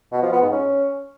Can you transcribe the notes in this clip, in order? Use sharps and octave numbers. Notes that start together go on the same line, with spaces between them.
B2
F3
B3
G#2
C#4